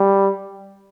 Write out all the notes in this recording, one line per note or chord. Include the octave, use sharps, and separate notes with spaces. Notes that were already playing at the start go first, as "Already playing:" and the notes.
Already playing: G3